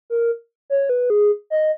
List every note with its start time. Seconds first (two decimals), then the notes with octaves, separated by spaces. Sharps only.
0.10 A#4
0.70 C#5
0.89 B4
1.10 G#4
1.50 D#5